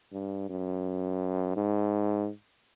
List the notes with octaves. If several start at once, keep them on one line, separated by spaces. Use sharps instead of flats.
G2
F#2
G#2